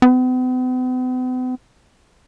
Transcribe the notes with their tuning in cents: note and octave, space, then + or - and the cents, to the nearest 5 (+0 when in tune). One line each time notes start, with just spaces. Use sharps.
B3 +45